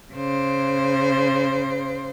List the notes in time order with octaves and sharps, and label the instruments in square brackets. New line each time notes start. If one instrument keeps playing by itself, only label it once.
[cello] C#3 C5